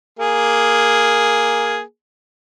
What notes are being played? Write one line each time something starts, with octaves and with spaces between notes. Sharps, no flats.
A#3 G#4